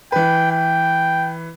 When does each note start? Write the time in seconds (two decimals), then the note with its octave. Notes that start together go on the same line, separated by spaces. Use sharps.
0.12 E3 B4 G5
0.51 G5